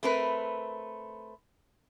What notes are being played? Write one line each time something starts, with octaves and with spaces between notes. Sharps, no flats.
A3 C4 A#4 B4